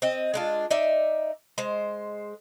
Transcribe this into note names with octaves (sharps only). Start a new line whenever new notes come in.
C4 D#5
G#3 D4 F4
D#4 D5 E5
G#3 C5